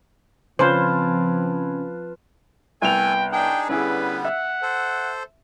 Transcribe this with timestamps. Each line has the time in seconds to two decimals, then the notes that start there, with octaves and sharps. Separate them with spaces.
0.59 C#3 F3 C4 C#4 F4 B4 C5 A5
2.82 C2 A3 B3 A4 G5 G#5 F7
3.32 D4 D#4 G#4 G5
3.69 D3 G3 B3 C#4 E4 G#4 B4
4.25 E5 F#5
4.62 A4 C5